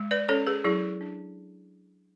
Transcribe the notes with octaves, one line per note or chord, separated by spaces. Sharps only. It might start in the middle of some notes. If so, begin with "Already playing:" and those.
Already playing: G#3
B4 D5
C#4 A4 C#5
G#4 B4
F#3 E4 G#4
D4